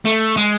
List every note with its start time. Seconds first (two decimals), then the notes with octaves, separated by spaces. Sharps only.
0.05 A3
0.37 G#3